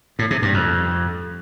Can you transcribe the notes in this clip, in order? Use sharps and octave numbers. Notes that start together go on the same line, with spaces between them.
A2
C3
G2
F2